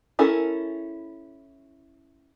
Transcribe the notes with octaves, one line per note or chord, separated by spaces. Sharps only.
C#4 E4 A4 A#4